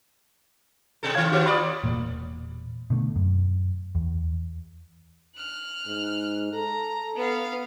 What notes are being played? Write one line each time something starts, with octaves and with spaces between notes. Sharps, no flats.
B2 A4
G#2 D#3 C#5 F5 G#6
D#3 B3 F#4 G4 C#5
F4 D5 B5 D6 D#6
E1 A#2 A#3
B2 D3 A3
F#2
E2
F6 F#6
G#2
A4 A#5
B3 F5